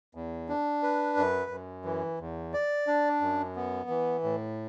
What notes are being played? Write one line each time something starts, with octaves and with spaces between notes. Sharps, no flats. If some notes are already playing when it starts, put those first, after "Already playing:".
E2
D4
B4
F#2
F#2
E3
E2
D5
D4
F#2
B3
E3
A2